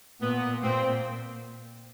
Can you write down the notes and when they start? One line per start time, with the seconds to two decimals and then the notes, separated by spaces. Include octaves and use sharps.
0.21 A#2 B3
0.63 A#2 C4